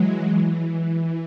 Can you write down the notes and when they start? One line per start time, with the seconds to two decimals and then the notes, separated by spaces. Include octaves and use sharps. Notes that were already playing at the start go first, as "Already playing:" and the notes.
Already playing: E3 F#3 G#3
0.28 E3